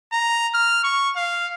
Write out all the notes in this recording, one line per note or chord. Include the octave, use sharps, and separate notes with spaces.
A#5
F6
C#6
F5